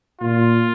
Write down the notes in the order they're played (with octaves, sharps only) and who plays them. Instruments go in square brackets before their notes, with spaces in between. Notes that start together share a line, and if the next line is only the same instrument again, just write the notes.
[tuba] A#2 [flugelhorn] F4